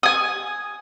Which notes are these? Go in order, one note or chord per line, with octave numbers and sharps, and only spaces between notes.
G#5 D#6